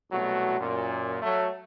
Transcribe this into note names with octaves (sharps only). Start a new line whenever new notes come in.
C2 B2 F#3 A3 F#4
F#2 A#2
F#3 A3